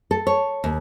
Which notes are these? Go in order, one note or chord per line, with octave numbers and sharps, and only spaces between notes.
A4
C#5
D#2